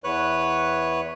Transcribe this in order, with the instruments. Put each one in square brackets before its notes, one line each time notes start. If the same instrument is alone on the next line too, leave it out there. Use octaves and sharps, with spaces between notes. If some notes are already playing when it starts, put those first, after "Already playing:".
[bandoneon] E2 B4 C#5 F#6